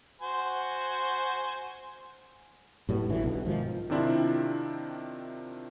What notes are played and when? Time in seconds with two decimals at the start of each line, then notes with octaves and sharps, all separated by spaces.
0.21 F#4 C5 G#5
2.89 A2 G3 G#3 B3
3.09 A1 D3 E3 F#3
3.23 B1 B2
3.46 G#2 D#3 F3
3.90 C3 D#3 C4 D4 E4 F4